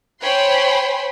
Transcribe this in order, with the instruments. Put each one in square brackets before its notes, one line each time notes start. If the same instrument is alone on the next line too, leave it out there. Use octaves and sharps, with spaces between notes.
[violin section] C5 C#5 G5 G#5 B5 C6